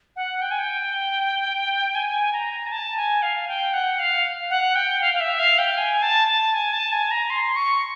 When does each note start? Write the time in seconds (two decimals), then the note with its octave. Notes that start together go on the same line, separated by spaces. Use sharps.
0.16 F#5
0.41 G5
0.51 G#5
0.58 G5
1.95 G#5
2.33 A#5
2.67 G#5
2.72 A5
2.97 G#5
3.22 F5
3.48 G5
3.73 F#5
3.99 F5
4.50 F#5
4.75 G5
5.01 F5
5.14 F5
5.20 E5
5.39 F5
5.58 G5
5.77 G#5
6.02 A5
6.28 A5
6.54 G#5
6.73 A5
6.92 G#5
7.11 A#5
7.30 C6
7.56 C#6